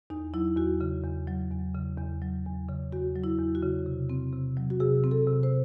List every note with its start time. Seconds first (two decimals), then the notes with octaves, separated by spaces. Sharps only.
0.10 E2 D#4
0.34 F#3 E4
0.57 E2 F#4
0.81 C#3
1.04 E2
1.28 F#3
1.51 E2
1.75 C#3
1.98 E2
2.22 F#3
2.46 E2
2.69 C#3
2.92 E2 F#4
3.16 F#3
3.24 E4
3.39 E2
3.55 F#4
3.63 C#3
3.86 C3
4.10 C4
4.33 C3
4.57 F#3
4.70 F#4
4.80 C3 G#4
5.04 C4
5.11 A4
5.27 C3
5.43 C5